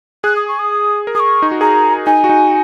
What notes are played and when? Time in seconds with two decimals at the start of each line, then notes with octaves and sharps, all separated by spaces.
0.24 G#4 F#6
0.36 D#6
0.48 C#6
0.59 D#6
1.07 A#4
1.15 G#4 D#6
1.20 C#6
1.42 D#4
1.51 F#4
1.61 G#4 A#5
2.06 D#4 G#5
2.24 F#4
2.29 D#4